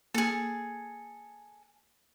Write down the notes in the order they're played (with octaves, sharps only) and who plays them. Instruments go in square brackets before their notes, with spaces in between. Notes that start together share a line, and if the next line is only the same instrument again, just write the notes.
[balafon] A#3 [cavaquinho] G#4 A4